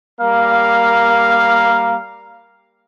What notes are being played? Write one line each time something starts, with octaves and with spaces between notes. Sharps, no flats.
G3 A#3 A#4 F5